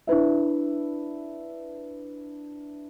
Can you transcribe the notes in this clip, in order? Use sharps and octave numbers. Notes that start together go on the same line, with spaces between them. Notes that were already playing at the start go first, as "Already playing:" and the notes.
D4 E4 B4 E5